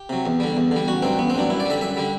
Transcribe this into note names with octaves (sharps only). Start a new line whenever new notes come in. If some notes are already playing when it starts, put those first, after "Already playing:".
Already playing: G4
C3 F#3
E2
D3 G3
E2
D3 G3
A1 F#4
G2 F#3 C4
A1 B3
C4
G2 F#3 D4
F#2 E4
D5
D3 G3 E5
F#2 E5
D3 G3